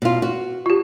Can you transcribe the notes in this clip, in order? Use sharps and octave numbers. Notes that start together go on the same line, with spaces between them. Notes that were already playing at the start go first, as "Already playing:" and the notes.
B2 F4
F#4
F4 G4